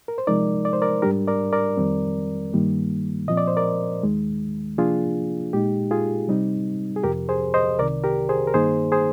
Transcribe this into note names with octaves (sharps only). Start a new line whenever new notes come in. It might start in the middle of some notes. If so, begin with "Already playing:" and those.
A#4
C5
C3 F3 G#3 D#4 A#4 D5
D5
C5
A#4 D5
G#2 G3 D4 G4 A#4
A#4 D5
A#4 D5
F2 D#3 G3 C4
G2 D#3 G3 A#3
A#2 F3 C4 D#5
D5
C5
A#4 D5
D#2 D#3 G#3
C3 F3 A#3 D4 F4 G#4
A#2 G#3 D#4 G4
F4 G#4
C3 G3 C4 D#4
G#4
F2 C3 F3 G4 A#4
G#4 C5
C5 D#5
C2 C3 D#3 A#4 D5
G4 A#4
G#4 C5
A#4
G2 D#3 A#3 D#4 G#4 C5
G#4 C5